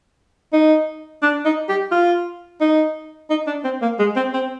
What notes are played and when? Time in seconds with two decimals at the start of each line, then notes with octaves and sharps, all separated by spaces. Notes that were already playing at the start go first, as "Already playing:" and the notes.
0.53 D#4
1.22 D4
1.45 D#4
1.69 G4
1.91 F4
2.60 D#4
3.30 D#4
3.47 D4
3.64 C4
3.82 A#3
3.99 G#3
4.16 C4
4.34 C4